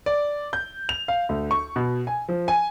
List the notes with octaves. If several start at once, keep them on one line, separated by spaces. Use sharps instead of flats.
D5
G6
F7
F5
D2
C#6
B2
G#5
F3
G#5